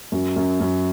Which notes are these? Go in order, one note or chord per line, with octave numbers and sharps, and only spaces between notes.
F#2
F#2
F#2